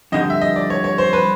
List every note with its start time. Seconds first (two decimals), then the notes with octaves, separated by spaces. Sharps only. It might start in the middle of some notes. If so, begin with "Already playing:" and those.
0.12 F2 D3 G3 D#5
0.30 E5
0.41 D#5
0.56 D5
0.70 C#5
0.84 C#5
0.98 C5
1.13 B4